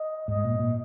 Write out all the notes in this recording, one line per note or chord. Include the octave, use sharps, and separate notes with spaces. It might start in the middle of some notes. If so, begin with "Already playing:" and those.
Already playing: D#5
G#2 D#5
A#2
A#2